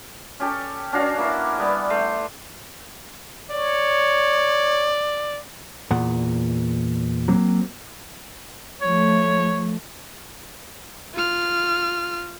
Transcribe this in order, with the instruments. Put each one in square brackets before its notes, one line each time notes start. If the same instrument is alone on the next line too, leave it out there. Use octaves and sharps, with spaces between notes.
[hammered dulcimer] C#4 G4 A4
C#4 D4 F#4 F5
A#3 E4
G3 B3
A3 C6
[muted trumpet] C#5 [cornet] D5
[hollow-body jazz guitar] E2 A#2 F#5
[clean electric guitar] F#3 A#3 C4
[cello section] F3 A3 [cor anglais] C#5
[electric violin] F4 F6